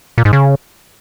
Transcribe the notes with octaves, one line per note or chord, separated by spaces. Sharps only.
A#2
G#2
C#3